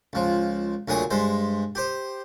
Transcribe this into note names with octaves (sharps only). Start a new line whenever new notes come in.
C#2 F3
D2 A#2 F#3 G#4 D#6
G2 G#3 C5
G4 C5